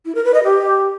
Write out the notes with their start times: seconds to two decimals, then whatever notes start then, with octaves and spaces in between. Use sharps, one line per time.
0.05 E4
0.15 A#4
0.25 B4
0.34 D#5
0.44 G4